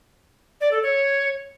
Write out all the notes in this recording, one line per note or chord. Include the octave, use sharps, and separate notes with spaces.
D5
A4
C#5